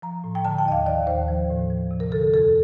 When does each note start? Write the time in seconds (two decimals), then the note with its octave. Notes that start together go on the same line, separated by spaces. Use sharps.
0.02 F3 A#5
0.24 A2
0.35 G5
0.45 D3 A5
0.59 G5
0.66 D#2 D#5
0.72 F5
0.86 D#3 D5
1.07 D#2 C5
1.28 F3
1.50 A2
1.70 F3
1.91 C3
2.00 A#4
2.12 D3 A4
2.34 F2 A4